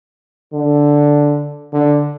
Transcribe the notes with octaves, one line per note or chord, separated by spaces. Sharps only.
D3
D3